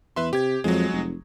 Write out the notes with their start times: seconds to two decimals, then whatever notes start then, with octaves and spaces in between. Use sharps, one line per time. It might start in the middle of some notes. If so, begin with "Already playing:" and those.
0.16 E2 B4 E5 C6
0.33 C3 G4 G#6
0.64 F2 F#3 G#3
0.93 F1